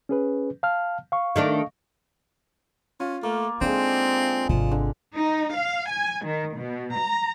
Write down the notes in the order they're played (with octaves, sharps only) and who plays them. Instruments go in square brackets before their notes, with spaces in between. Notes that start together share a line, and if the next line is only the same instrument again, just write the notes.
[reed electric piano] C#4 G#4 B4
F5 A5 F6
F5 C#6
[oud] D#3 A3 D4
[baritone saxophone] C#4 [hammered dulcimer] F4
[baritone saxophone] A3 [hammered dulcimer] A#3
[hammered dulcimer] D3 G#3 [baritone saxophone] C4 [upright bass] D#4
[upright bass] G#1 C3 [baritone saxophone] F3
[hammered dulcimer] D3
[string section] D#4
F5
G#5
D#3
B2
A#5